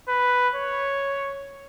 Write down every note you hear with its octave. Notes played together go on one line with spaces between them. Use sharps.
B4
C#5